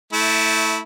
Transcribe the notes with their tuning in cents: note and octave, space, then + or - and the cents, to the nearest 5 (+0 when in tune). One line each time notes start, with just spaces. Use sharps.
A3 +0 E4 -20